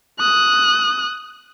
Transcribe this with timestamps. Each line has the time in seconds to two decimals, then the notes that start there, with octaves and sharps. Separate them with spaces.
0.19 D#6 F#6